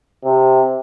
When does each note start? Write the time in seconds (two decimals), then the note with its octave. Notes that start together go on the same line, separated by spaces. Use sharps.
0.24 C3